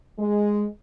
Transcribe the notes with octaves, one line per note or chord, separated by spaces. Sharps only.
G#3